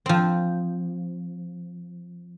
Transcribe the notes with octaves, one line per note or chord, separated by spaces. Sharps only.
F3 C4